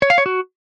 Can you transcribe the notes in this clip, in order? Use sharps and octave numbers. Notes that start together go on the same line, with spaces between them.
C#5
F5
C#5
F#4